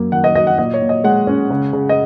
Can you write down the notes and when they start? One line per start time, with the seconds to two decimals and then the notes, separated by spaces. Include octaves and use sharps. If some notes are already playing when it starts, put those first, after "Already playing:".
Already playing: F#2 A#3
0.12 D#3 F#5
0.24 D#5
0.35 F#3 D#5
0.47 F#5
0.58 A#2 D#5
0.74 C#5
0.81 A#2
0.89 D#5
1.04 G#3 F#5
1.27 C#4
1.50 C#3
1.73 C#3
1.89 D#5